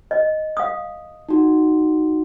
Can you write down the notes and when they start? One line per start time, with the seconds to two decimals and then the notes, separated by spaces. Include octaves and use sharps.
0.11 D#5
0.57 F5 D#6
1.29 D#4 F#4